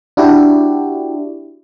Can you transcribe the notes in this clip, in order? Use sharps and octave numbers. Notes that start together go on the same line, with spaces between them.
D4 E4 F#4 G4